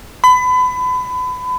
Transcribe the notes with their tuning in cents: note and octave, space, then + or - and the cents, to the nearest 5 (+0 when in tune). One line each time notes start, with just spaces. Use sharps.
B5 +30